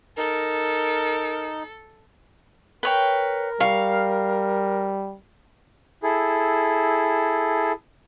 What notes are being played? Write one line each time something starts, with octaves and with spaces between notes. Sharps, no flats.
D#4 A4 A#4
A#4 B4 C#5 G5
G3 F5 C#6
E4 G#4 A4